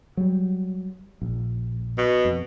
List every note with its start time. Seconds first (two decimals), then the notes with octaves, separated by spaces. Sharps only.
0.17 F#3 G3
1.22 A#1
1.98 B2
2.25 F2